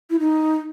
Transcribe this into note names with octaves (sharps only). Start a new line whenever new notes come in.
E4
D#4